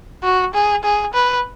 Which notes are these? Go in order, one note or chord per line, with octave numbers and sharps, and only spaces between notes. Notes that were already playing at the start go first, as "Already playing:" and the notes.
F#4
G#4
G#4
B4